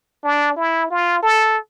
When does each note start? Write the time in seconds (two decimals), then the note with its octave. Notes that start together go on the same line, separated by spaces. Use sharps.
0.24 D4
0.57 E4
0.90 F4
1.23 A4